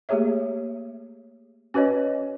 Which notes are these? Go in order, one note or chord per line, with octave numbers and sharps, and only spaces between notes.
A3 A#3 G4 G#4 C#5 E5
C#4 F#4 B4 C#5 D#5